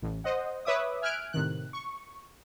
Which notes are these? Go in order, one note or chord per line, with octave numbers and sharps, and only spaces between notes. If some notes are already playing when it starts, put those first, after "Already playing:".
A1
C5 D#5 F#5
B4 C#5 E5 D6 D#6
E5 G#5 F6 F#6 G#6 D7
A2 C3 D#3 F#6
C#6